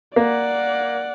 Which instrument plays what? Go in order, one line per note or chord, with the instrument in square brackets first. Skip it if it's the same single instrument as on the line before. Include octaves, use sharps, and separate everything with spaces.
[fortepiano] A#3 [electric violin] D5 F#5